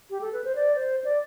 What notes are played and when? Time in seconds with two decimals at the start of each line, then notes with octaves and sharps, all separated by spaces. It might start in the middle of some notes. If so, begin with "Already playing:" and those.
0.10 G4
0.21 A4
0.33 B4
0.44 C5
0.55 D5
0.75 C5
1.04 D5